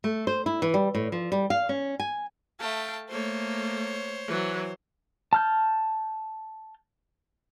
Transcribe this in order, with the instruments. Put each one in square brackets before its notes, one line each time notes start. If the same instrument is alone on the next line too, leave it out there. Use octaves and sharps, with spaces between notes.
[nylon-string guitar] A3
C5
E4
E3
G3
A2
F3
G3
F5
C#4
G#5
[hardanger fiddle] A3 A5 [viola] F5 G5
[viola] A3 A#3 [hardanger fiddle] C5 C#5
[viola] E3 F#3
[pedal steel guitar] A5 F6 G6